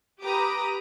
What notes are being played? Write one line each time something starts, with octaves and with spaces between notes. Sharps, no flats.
G4 B4 A#5 D6 D#6